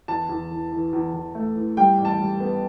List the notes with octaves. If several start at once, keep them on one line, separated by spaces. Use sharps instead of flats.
E2 A5
E2
E3
E3
E2
E2
A3
E3
G3 G5
A1
A5
G3
B3